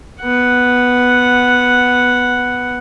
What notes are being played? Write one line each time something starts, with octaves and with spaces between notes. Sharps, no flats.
B3 F#5